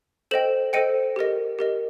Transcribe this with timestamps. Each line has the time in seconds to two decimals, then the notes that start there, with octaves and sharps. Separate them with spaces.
0.31 A4 C5 D#5 G5 E7 F#7
0.73 A4 C5 D#5 G5 C#7 D#7
1.16 G4 A#4 D#5
1.59 G4 A#4 D#5